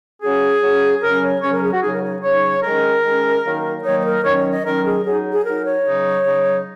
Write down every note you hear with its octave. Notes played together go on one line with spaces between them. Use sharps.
F#3 C#4 G#4
F#3 C#4
C#3 F#3 C#4 A#4
C#5
C#3 F#3 C#4 C#5
A#4
G#4
F#4
C#3 F#3 D#4 G#4
A#4
C#5
C#3 F#3 D#4 C#5
D#3 G#3 C#4 A#4
D#3 G#3 C#4
D#3 F#3 A#3 D#4
D#3 F#3 A#3 D#4 C#5
C#5
A#4
D#3 F#3 C#4 C#5
C#5
D#5
D#3 F#3 C#4 A#4
G#4
F#3 D#4 G#4
G#4
F#3 D#4 A#4
C#5
C#3 F#3 D#4
C#3 F#3 D#4